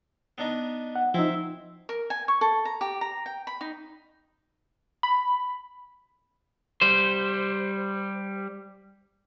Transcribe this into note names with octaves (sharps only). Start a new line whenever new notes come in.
B3 D4 D#4
F#5
F3 C4 D#4 E4
A#4
G#5
C#6
A4
A#5
G4
A#5
G5
B5
D#4
B5
G3 C5